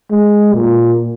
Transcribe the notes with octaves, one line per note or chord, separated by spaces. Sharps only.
G#3
A#2